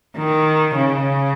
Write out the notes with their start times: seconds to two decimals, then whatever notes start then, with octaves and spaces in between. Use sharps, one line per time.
0.17 D#3
0.77 C#3